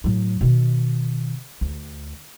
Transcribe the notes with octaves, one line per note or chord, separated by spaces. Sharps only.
A2 F#3
B2 D#3
D2